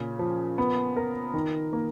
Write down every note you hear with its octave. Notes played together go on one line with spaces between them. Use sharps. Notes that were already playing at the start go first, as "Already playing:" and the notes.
Already playing: A#2 C#3
F3
B3
A#4
D#3
A#3